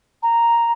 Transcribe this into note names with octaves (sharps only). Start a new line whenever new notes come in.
A#5